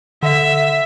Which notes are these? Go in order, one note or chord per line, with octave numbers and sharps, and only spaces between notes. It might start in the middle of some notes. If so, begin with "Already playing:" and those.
D3 E5